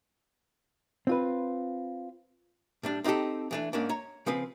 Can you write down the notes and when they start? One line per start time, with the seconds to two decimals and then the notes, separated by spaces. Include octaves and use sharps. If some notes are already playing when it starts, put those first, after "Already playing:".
1.07 C4 F4 B4
2.83 A2 G3 D4
3.04 C4 D#4 F4 G4 A4
3.51 E3 A3 D4
3.73 G#2 A#3 C#4 D4
3.89 C#5 A#5
4.26 C#3 F3 C4 B4